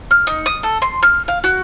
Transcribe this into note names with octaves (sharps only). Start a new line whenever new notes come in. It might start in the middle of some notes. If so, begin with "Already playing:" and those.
F6
D#4
D#6
A4
C6
F6
F5
F#4